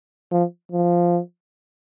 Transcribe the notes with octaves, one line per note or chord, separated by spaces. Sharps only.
F3
F3